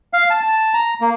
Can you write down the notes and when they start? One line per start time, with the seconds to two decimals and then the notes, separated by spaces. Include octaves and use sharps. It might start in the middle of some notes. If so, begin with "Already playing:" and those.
0.13 F5
0.30 A5
0.43 A5
0.74 A#5
1.01 A#3